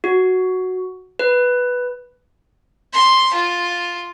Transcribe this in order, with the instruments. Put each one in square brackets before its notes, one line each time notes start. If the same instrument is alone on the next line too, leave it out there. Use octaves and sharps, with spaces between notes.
[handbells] F#4
B4
[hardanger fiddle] C6
F4